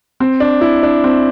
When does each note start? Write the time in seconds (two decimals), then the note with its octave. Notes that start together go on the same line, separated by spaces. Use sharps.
0.20 C4
0.40 D4
0.61 E4
0.83 D4
1.04 C4